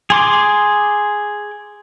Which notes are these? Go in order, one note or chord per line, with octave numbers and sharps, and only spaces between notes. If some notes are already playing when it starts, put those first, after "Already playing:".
G#4 C6 D6